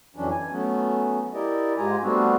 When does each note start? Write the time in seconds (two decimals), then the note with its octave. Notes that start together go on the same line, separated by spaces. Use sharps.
0.16 F2 E3 F#3 C#4 D4
0.31 G#5
0.51 F#3 A3 B3 C#4
1.34 E4 G4 A#4 D5 D#5
1.77 G#2 G#3 F4 G4 G#5 A#5
2.02 G3 A3 B3 C4 D4 F#4